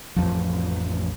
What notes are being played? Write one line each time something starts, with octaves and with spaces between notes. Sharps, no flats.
A1 F2 F3